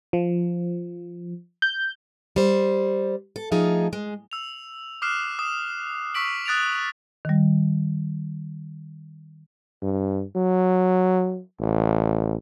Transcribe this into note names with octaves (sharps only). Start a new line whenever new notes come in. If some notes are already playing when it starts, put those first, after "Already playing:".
F3
G6
G3 C5
A4
F3 A3 D#4 G#4
G#3
E6 F7
D6 D#6 F6 F#6 C7 E7
D#6 E7
C#6 E6 B6 D7 F#7
D#6 F#6 A6 D7 E7 F7
D#3 G3
G2
F#3
A1